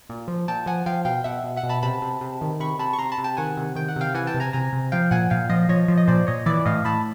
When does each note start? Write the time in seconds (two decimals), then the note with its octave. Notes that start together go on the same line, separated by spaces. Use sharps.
0.09 A#2
0.28 F3
0.48 A#2 G5 A5
0.66 F3 F#5 G#5
0.86 F3 F5 G5
1.05 B2 F5 G5
1.24 B2 E5 F#5
1.44 B2
1.56 E5 F#5
1.63 B2
1.69 A5 B5
1.83 C3 A5 B5
2.02 C3
2.21 C3
2.41 D#3
2.60 C3 B5 C#6
2.79 C3 A5 B5
2.93 C#6
2.98 C3 A#5 C6
3.12 A5 B5
3.18 C3
3.24 G5 A5
3.37 D#3 F#5 G#5
3.57 C3
3.76 D#3 G5
3.88 F#5
3.96 C3 F5 G5
4.14 E3 F#5 G#5
4.27 G5 A5
4.34 C3
4.40 G#5 A#5
4.53 C3 G#5 A#5
4.73 C3
4.92 F3 F5 G5
5.11 A#2 F#5 G#5
5.30 A#2 F5 G5
5.49 F3 D#5 F5
5.69 F3 C#5 D#5
5.88 F3
5.97 D#5
6.07 A#2 C5 D5
6.27 A#2 C#5 D#5
6.46 E3 D5 E5
6.65 A2 D#5 F5
6.85 A2 A5 B5